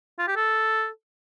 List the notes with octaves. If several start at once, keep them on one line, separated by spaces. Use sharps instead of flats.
F4
G4
A4